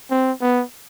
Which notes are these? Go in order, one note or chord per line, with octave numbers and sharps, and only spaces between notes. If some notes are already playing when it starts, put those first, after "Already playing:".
C4
B3